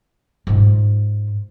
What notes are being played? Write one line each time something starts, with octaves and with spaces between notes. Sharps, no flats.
G#2 F4